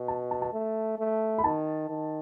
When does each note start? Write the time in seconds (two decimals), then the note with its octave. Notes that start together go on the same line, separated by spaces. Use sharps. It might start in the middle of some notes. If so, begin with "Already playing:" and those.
Already playing: B2
0.08 A5
0.31 A5
0.42 A5
0.53 A3
0.98 A3
1.38 B5
1.44 D#3 A5
1.89 D#3